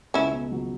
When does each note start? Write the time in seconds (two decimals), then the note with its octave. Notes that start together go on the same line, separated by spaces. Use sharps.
0.14 C#2 C#4 E4
0.33 B2
0.52 F#3